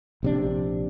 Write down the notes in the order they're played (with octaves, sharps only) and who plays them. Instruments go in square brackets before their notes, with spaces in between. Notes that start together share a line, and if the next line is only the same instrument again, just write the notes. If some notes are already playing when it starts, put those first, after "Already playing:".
[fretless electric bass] A#1 C3 D4